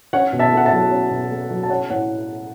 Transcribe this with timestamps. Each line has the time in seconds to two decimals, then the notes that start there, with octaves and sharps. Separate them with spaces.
0.13 C#4 C#5 F#5
0.33 B2
0.39 E5 A5
0.52 A3 F#5
0.65 E5 A5
0.72 F#3
0.92 C#4
1.11 B2
1.31 A3
1.51 F#3
1.63 A5
1.70 C#4 C#5 F#5
1.89 A2 C#5 F#5